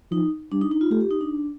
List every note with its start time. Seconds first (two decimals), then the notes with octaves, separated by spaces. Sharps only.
0.11 F3 D#4
0.52 G3 D4
0.61 D#4
0.71 D#4
0.81 F4
0.91 A3 G4
1.01 G4
1.11 D#4
1.21 D4